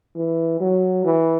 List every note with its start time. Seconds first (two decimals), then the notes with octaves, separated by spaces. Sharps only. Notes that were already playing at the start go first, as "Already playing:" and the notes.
0.15 E3
0.60 F#3
1.05 E3